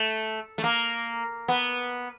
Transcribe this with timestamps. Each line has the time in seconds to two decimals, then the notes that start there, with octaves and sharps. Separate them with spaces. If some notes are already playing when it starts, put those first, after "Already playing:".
Already playing: A3
0.58 A3
0.64 A#3
1.48 B3